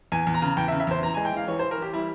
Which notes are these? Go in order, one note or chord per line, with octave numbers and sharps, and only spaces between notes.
E2 G#5
E2
A#5
C#3
E2 G5
E5
C#3
E5
E2 C5
E3 A#5
G#3 G#5
G5
E3 F5
E3 C#5
C5
E3
A#4
E3 G4
G3 E4